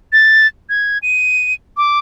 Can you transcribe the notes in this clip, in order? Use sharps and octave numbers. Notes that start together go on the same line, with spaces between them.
A6
G#6
D#7
D6